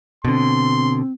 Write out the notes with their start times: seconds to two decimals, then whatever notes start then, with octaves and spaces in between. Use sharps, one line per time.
0.25 B2 D3 C4 C6